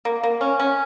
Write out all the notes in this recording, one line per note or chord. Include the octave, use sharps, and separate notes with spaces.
A#3
A#3
C#4
C#4